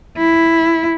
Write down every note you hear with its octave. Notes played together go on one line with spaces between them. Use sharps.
E4